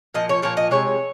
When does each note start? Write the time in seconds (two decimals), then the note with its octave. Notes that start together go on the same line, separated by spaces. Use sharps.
0.14 A#2 F3 D#5
0.29 C#5
0.42 A#2 F3 C#5
0.57 D#5
0.71 C3 F3 G#3 C#5